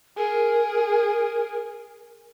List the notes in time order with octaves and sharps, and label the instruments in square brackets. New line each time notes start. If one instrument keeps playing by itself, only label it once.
[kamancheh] G#4 [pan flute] A#4